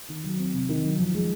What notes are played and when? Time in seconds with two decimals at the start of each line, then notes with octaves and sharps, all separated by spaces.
0.09 D#3
0.24 F#3
0.39 C4
0.54 C3
0.69 D#3
0.84 F#3
0.99 F3
1.15 G#3